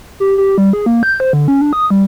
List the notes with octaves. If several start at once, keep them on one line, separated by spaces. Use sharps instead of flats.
G4
G4
G3
G#4
A#3
G6
C5
D3
C#4
D4
D#6
G3